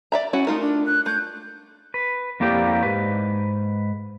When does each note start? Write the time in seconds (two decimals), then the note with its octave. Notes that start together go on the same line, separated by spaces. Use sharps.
0.12 D5 E5 A#5
0.33 C#4 E4 F#4
0.47 A3 D#4 F4 A#4
0.61 D4
0.86 F#6
1.06 A3 G6
1.94 B4
2.40 F2 A#3 E4 G4 D5
2.83 G#2 B4